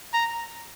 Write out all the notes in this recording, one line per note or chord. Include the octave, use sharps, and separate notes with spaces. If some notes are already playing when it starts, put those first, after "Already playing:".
A#5